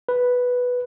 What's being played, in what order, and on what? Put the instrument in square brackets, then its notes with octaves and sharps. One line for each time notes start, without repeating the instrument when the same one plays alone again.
[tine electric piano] B4